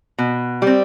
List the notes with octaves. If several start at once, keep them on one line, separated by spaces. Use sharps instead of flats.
B2
G3 C4